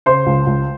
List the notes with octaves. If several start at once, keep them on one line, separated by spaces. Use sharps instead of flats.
C#3 C5 C6
C#2
C#2